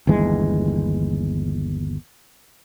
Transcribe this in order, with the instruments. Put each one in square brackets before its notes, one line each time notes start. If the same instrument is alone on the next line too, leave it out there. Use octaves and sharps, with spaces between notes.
[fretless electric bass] G1 D#2 E3 G#3